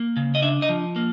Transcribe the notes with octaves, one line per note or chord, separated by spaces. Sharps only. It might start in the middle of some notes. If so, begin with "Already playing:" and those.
Already playing: A#3
C#3
D#5
D4 E5
D#5
F3
A#3